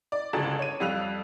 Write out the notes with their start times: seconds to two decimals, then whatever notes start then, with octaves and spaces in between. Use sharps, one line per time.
0.12 D5
0.33 G1 C#2 F#4 G#4 A5
0.59 C#5 D#7
0.80 F2 G3 F5 E6 F#6 F7